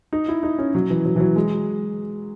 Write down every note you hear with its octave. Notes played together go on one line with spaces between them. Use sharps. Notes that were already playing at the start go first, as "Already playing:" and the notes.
D#4
E4
D#4
C#4
F#3
E3
F#3
E3
F#3
G#3